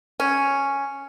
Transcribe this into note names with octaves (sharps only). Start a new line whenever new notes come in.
C#4